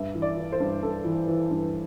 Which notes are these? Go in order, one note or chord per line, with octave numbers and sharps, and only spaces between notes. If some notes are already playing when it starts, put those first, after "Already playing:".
Already playing: G2 E5
E3
D5
E3
C5
G2
G2 A4
E3
E3
G2